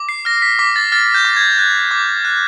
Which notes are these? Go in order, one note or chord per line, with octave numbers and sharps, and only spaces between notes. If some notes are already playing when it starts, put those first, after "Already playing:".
Already playing: D6
C7
F6 A#6
B6
D6 B6
A6
F6 A6
G6
D6
G#6
F#6 G#6
D6
F#6